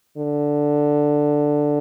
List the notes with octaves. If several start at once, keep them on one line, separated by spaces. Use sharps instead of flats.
D3